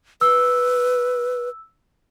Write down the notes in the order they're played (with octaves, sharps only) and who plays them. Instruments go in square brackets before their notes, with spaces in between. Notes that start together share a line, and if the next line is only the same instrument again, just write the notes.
[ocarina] B4 [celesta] E6